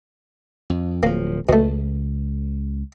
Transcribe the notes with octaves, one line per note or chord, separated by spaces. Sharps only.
F2
D1 F3 A#3
C#2 B2 A3